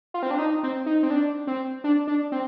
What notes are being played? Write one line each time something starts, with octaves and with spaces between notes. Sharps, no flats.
F4
C4
D4
D#4
C4
D#4
C4
D4
C4
D4
D4
C4